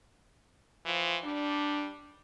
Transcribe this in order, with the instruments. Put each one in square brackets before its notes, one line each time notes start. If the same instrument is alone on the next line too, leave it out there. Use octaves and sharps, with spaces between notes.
[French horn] E3 [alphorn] F3
[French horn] G3 [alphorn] D4